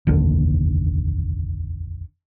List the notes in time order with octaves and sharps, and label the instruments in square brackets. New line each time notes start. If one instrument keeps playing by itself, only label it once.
[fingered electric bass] F1 A#1 D#2 D3